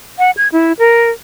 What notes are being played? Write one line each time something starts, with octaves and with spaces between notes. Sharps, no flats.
F#5
G#6
E4
A#4